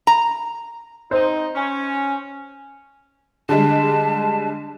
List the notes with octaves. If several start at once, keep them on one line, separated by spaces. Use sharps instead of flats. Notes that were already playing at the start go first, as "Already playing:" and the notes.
A#5
C4 D#4 C5
C#4
D3 G3 G#3 A5